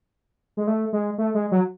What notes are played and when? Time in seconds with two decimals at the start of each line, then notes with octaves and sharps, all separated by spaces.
0.57 G#3
0.67 A3
0.93 G#3
1.18 A3
1.34 G#3
1.51 F#3